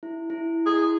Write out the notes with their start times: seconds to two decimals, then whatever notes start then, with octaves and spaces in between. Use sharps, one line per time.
0.03 E4
0.30 E4
0.66 G#4